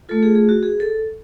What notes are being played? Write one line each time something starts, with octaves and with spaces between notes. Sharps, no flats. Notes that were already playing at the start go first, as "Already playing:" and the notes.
A3 F4 A4
G#4
G#4
F#4
G#4
A4